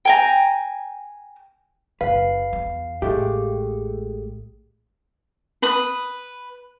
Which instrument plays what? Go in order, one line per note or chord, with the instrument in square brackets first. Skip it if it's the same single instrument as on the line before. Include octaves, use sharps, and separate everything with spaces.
[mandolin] G5 G#5 A#5
[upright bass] F#1 [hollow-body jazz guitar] B4 [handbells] F5
[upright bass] E2
[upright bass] A1 [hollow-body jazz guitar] G#3 A3 G4
[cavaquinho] B4 B5 D#6